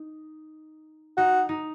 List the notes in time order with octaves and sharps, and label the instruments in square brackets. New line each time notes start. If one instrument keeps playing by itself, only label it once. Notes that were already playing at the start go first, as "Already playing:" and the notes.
Already playing: [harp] D#4
[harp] D#4 [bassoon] F#4
[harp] D#4